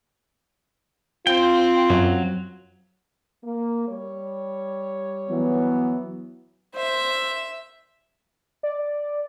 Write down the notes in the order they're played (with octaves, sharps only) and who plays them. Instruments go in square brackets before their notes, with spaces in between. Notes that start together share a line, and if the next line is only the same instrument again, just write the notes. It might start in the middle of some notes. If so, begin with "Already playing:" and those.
[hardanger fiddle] C4 [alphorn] F4 [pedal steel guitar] G5
[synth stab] F#2 [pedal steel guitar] F#3
[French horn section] A#3
G3 C#5
[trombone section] E3 F#3 B3
[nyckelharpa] C5 [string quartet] E5
[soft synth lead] D5